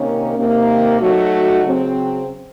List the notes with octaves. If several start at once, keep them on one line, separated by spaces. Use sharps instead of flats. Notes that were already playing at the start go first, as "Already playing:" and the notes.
Already playing: C3 D#3 A#3 C#4
C3 D#3 A#3
F#3 A3 D#4 F#4
C#3 F#3 C4